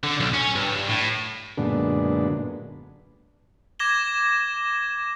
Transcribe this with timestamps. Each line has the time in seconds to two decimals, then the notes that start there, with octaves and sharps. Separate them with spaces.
0.04 D3
0.20 B1
0.34 C#4
0.55 G2
0.88 A2
1.58 F#2 A#2 D3 G#3 B3 D4
3.79 D6 G#6 A#6 E7 G7